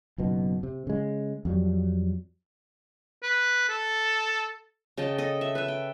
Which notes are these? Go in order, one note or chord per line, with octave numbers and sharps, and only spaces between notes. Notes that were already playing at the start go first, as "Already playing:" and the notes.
F#1 B1 B2
C3
C#3 G#3
F2 F#3 G3
B4
A4
C#3 D#5 G5 A5
A4 D#5
E5
B4 E5
G5